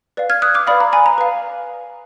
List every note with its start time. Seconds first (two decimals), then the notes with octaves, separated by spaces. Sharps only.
0.17 B4 D5 F5
0.30 F6 G#6
0.42 D#6 F#6
0.54 D6 F6
0.67 B4 D5 F5 B5 D#6
0.80 A#5
0.93 G#5 B5
1.06 A#5
1.18 B4 F5